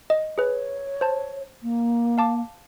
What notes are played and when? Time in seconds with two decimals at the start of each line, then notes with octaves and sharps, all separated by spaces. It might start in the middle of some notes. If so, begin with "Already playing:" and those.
0.10 D#5
0.38 G#4 B4 C#5
1.01 C5 A5
1.62 A#3
2.18 F5 A5 D6